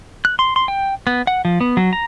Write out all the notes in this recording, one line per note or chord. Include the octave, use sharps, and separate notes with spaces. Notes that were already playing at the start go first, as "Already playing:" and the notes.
F#6
C6
C6
G5
B3
F#5
F3
B3
F#3
A#5